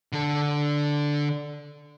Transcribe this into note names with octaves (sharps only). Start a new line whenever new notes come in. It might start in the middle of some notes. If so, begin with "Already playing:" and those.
D3 A4